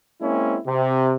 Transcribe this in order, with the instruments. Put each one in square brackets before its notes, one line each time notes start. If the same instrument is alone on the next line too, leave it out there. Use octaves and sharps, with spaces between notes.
[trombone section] G#3 A#3 C4 C#4 E4
C3